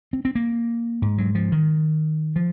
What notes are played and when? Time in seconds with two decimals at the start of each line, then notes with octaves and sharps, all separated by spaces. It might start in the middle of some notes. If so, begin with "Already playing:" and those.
0.13 C4
0.25 C4
0.35 A#3
1.02 G#2
1.18 F#3
1.35 F3
1.52 D#3
2.36 F3